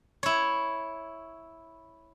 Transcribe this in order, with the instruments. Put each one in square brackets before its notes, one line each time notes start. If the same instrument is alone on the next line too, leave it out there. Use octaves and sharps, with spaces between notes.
[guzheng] E4 C#5